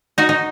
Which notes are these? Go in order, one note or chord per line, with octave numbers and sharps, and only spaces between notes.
D#4 F#4
D#4